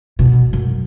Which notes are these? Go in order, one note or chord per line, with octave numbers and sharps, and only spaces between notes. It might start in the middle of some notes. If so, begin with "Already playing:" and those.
B2
F#2